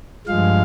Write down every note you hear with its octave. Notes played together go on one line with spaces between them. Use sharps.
G2 F3 G#3 F5